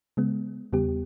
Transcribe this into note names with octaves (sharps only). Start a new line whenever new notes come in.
C#3 G#3 B3
E2 C#3 G3 B3 G4